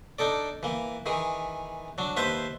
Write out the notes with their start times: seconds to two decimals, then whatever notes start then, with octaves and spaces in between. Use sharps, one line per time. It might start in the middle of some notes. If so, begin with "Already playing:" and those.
0.19 D4 D#4 A4 D5
0.63 E3 A#3
1.06 D#3 E3 G#4
1.98 F#3 D4
2.17 D#2 B4 C5 E5 A5 C6